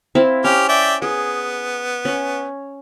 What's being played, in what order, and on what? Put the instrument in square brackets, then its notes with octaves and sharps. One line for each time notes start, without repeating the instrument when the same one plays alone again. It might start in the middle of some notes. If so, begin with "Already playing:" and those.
[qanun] C4 E4 F5
[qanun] C#4 [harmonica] G4 F6
[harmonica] D5 E5 G5
[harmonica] B3 [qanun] G#4
[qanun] C#4